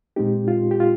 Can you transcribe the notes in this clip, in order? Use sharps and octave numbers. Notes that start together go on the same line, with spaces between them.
A#2 G#3 C4 D#4 G4
F4
G4
F4